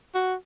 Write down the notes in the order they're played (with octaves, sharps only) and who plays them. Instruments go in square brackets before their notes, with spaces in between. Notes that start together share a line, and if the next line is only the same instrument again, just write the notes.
[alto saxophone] F#4